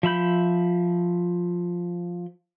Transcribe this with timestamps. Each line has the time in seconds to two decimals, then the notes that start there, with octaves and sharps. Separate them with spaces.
0.03 F3 E5 B5 G6